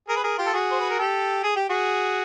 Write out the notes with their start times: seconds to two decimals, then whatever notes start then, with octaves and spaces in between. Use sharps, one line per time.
0.08 G#4 A#4
0.16 B4
0.23 G#4 A#4
0.38 F4 G4
0.46 A4
0.53 F#4 G#4
0.71 C5
0.80 B4
0.90 A#4
0.99 G4 A4
1.43 G#4
1.56 G4
1.69 F#4 G#4